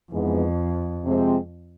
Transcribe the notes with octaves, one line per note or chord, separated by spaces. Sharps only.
F2 G#2 E3 G#3 B3
C3 F3 G#3 C4